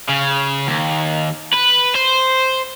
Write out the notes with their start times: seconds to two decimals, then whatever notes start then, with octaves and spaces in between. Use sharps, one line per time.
0.09 C#3
0.67 D#2
1.53 B4
1.95 C5